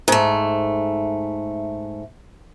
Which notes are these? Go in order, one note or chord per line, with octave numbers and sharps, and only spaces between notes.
G#2 A3